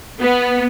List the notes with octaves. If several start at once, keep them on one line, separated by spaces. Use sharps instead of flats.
B3